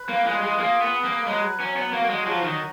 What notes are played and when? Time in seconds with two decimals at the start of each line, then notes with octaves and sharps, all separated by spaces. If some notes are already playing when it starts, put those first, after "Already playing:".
Already playing: B4
0.09 A#3
0.26 G#3 F4
0.43 G#3
0.60 A#3 G#4
0.81 B3
0.93 B4
1.04 A#3
1.26 F#3 G#3
1.59 F#3 C#4
1.76 B3
1.93 A#3 F#4
2.05 A#3
2.10 G#3
2.26 F3 F#3
2.44 D#3